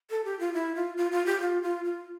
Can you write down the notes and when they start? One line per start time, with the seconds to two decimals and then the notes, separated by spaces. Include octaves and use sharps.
0.10 A4
0.25 G4
0.39 F4
0.53 E4
0.75 F4
0.97 F4
1.12 F4
1.26 G4
1.41 F4
1.62 F4
1.85 F4